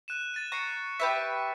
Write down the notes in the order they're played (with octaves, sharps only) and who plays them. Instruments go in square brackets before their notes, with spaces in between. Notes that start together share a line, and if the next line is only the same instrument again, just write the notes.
[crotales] F#6 D#7 E7
A6 D#7
[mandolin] A#5 [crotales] C#6 C7 C#7
[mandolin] G4 B4 E5 [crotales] B6